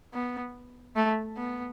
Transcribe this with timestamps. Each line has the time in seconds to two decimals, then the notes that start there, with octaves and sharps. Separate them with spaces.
0.14 B3
0.96 A3
1.38 B3